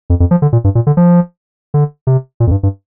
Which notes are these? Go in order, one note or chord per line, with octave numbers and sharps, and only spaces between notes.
F2
F2
F3
D3
A#2
G2
A#2
D3
F3
D3
C3
A#2
F2
G2
G2